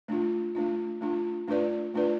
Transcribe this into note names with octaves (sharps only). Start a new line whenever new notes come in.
A3 D4 F4
A3 D4 F4
A3 D4 F4
A3 D4 F4 B4 D5
A3 D4 F4 B4 D5